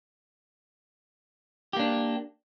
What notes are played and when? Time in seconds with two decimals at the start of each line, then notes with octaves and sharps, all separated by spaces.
1.73 G4
1.76 A#3
1.80 D4